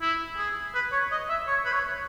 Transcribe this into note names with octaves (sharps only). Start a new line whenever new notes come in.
E4
G#4
B4
C#5
D#5
E5
C#5
B4
C#5